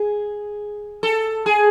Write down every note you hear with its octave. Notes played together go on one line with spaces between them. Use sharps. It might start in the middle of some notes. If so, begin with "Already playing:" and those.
Already playing: G#4
A4
G#4